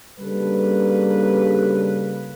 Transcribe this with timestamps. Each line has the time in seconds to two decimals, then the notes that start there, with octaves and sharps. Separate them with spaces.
0.20 C#3 G3 A#3 D4 A4 B4